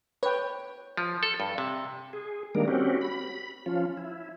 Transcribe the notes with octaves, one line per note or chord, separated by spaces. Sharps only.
B4 C#5 G5
F3
A4
G2
C3
G#4
D#3 G3 G#3 A#3 D4 A#4
C4 C#4 F#4 G4
B5
F3 C#4 F4
E4